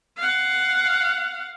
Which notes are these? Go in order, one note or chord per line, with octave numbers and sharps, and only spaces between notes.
F5 F#5